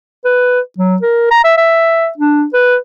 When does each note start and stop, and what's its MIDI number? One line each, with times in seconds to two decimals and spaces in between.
0.25 0.60 71
0.79 0.97 54
1.02 1.27 70
1.31 1.43 82
1.44 1.54 76
1.57 2.08 76
2.18 2.45 62
2.53 2.76 71